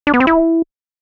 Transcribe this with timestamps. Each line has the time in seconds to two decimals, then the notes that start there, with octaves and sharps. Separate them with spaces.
0.07 D4
0.14 B3
0.20 C4
0.27 E4